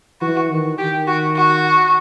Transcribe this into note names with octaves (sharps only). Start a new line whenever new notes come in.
E3 F#4
D#3
D#3 G4
F#4
F#4